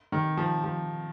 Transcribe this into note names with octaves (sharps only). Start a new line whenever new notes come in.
D#3
F3
F3